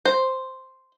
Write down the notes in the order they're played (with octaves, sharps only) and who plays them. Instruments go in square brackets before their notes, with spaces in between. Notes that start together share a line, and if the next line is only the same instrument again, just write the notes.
[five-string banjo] C5